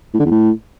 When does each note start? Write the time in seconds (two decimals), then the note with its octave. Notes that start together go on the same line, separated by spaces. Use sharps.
0.14 A2
0.19 D3
0.25 E2
0.31 A2